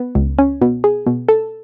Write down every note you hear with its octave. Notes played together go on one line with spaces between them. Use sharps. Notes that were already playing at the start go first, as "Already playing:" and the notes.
Already playing: B3
C#2
C#4
B2
G#4
B2
A4